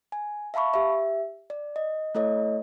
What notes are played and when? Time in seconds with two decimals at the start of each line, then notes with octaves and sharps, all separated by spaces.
0.12 G#5
0.54 E5 F5 A5 B5 C#6
0.74 G4 E5
1.50 D5
1.76 D#5
2.15 A3 E4 A4 C#5 D#5